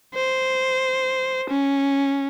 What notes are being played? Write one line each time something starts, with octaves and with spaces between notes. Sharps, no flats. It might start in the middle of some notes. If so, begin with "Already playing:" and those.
C5
C#4